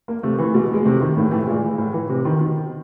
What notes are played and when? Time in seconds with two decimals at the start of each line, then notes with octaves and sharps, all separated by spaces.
0.08 A#3
0.23 C3 A3
0.38 E3
0.45 A3
0.54 B2 G#3
0.74 G#3
0.85 C3 A3
1.01 D#3
1.16 A2 A#3
1.31 E3 A3
1.47 A#2 G#3
1.78 A2
1.93 E3
2.09 C3
2.25 D#3
2.40 B2